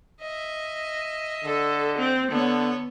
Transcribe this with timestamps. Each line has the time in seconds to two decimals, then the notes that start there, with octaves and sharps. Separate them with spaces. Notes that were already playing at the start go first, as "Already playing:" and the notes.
0.21 D#5 E5
1.44 D3 A4
1.98 C4
2.31 D3 B3 A4 C#5